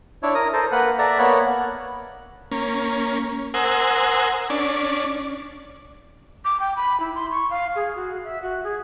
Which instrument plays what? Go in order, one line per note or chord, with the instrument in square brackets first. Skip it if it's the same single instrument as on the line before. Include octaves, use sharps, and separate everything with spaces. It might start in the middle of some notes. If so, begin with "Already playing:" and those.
[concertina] D4 E4 C#5
A#4 D#6
A4 A#4 C5
A#3 B4 F#5
A4 D5 E5 A#5
A#3 B3 C#5 F#5
[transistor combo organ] A#3 C#4
A#4 C5 F#5 G#5 D#6 E6
C#4 D4 D5
[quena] D6
G5
B5
E4
C6
C#6
F5
G#4
F#4
E5
F#4
G#4